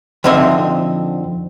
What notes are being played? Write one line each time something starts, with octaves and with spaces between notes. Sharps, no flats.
F2 D3 C4 D#4 E5